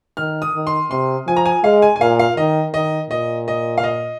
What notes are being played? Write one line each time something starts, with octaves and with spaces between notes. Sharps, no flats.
D#3 F6
D#6
D#3
C6
C3 C6
F3 G#5
A#5
G#5
G#3 F5
G#5
G#5
A#2 F5
F5
D#3 D#5
D#3 D#5
A#2 D#5
D#5
F5
D#5